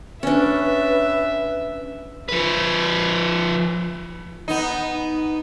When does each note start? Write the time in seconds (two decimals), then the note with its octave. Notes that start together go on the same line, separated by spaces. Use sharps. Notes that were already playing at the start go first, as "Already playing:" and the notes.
0.23 C#4 D4 B4 E5
2.29 F3 B4
4.48 B3 D#4